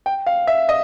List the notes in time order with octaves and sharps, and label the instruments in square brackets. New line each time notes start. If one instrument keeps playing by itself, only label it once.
[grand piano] G5
F5
E5
D#5